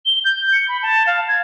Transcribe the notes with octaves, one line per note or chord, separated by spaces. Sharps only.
G7
G6
C#7
B5
A5
F5
G#6